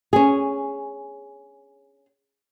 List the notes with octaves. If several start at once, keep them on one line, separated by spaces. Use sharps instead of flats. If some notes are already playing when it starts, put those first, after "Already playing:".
C#4 G#4